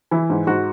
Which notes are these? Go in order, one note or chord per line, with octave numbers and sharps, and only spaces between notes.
E3 E4
G#2
G#2 F#4